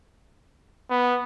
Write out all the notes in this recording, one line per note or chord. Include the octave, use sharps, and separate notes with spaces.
B3